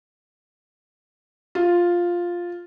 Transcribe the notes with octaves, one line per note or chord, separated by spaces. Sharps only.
F4